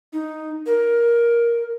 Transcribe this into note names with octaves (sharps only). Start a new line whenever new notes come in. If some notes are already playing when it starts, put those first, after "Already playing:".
D#4
A#4